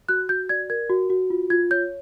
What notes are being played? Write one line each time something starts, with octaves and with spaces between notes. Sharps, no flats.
F#4 F#6
F#4 G6
D5 G#6
A#4 G#6
F#4
F#4
F4
F4 G#6
C#5 G6